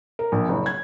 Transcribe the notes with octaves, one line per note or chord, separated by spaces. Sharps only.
A#4
A#1
F#1
G#6